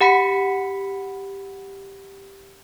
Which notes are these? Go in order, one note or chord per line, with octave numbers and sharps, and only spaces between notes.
G4 F#5 B5 B6 C#7